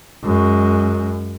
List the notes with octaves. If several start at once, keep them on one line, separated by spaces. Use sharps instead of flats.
F#2 G#3